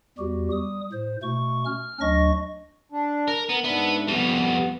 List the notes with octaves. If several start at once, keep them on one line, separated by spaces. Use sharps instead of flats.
E2 G3 F#4 G4
G3 D#6
A2 C5
B2 A3 C#6
C#4 F6
D2 F#3 D4 D#5 C#6 A#6
D4
A#4
B3 A#4
G#2 B3 D4 B4 E5
F2 G3 B3